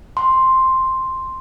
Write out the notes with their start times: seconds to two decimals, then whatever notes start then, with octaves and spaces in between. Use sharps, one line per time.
0.17 C6